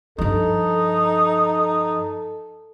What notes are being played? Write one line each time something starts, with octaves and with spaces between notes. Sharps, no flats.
G2 F3 D#4 A4